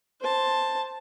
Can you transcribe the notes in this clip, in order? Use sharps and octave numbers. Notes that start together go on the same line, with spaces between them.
C5 A5